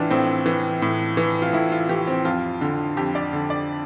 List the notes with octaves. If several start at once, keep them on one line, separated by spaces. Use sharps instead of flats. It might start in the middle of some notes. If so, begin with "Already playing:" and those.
Already playing: A2 E3 D4 E4 F4
A2 C4
E3
A2
E3
F4
A2 E4
F4
E3 G4
C4
F2 F4
D3
F2 G4
D5
D3
D5